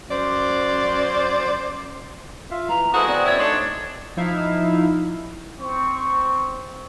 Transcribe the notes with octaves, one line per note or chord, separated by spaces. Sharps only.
F#2 C5 D5
F4 E5 F5
E3 A#5
G#3 E4 F#4 A4 B4 C5 D#6
B3 C4 D5
F#2 E4 C#5
A3 D4 D#4 C#5 C6 C#6
F3 D#4 E4 E5 F5
C4 C#6